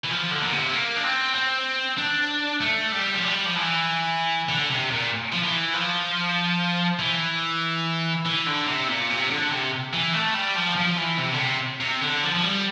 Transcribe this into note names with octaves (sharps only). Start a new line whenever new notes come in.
E3
F3
D3
A#2
C3
A#3
D4
C4
C4
D4
A3
G3
F3
G3
F3
E3
D3
C3
A#2
F3
E3
F3
E3
E3
D3
C3
A#2
C3
D3
C3
E3
A3
G3
F3
F3
E3
C3
D3
C3
C3
D3
F3
F3
G3